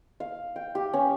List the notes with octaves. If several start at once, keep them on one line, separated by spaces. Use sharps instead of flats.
F5
G5
G4
C#4